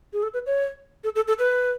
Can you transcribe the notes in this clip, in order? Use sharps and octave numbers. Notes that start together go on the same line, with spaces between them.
G#4
A4
B4
C#5
A4
A4
A4
B4